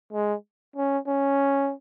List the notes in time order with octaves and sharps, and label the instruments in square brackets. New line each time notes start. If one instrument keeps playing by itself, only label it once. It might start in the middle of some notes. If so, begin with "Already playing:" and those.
[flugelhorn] G#3
C#4
C#4